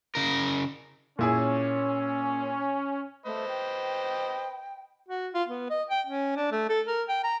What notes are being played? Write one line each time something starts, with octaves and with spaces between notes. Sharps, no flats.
C#3 A#4
A#2 C#4 E4 G#4
A3 B4 C5 D#5
G5
F#4
F4
B3
D#5
G5
C#4
D4
A3
A4
A#4
G5
A#5